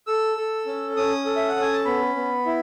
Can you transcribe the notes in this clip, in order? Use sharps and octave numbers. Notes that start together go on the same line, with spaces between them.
A4 E6
A4
C#4
C#4 D#6
A4
E5
F#5
C#4
G#5
A5
B3 B5
B3
E4